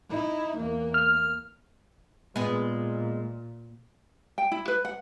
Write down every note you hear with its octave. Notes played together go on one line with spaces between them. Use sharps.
D#4 E4
E2 A#3
F6
A#2 G#3 B3
G5
E4
B4
F#5